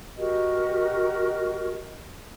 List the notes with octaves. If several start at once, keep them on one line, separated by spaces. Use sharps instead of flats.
F#4 G4 A#4 D#5